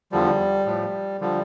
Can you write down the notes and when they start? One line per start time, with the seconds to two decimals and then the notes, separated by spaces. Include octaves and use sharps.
0.12 E2 D3 F3 G3
0.66 A2 F3
1.21 D3 F3 G3